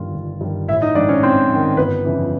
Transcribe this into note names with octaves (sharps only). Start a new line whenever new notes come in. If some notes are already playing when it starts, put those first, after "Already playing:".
Already playing: G1 G2 D#3 F4
G1
G2 D#3
A1 E4 E5
D#4 D#5
G#2 D#3 D4 D5
C#4 C#5
A1 C4 C5
G#2 D#3
G1 B3 B4
F2 C#3 E3